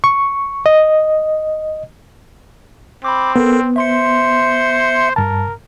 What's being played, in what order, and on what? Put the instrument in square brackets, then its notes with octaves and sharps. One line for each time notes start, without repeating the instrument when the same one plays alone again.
[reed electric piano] C#6
D#5
[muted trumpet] C4 [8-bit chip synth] B5 D6
[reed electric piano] B3 [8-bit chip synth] A4 A#4
[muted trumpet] C5 [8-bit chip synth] E5 C6 C#7
[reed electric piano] G2 A5 [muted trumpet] A#4